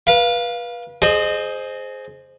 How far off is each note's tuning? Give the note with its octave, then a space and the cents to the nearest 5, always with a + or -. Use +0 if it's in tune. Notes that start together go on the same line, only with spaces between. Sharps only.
B4 -30 F5 +0
G#4 +20 C5 +0 D#5 -25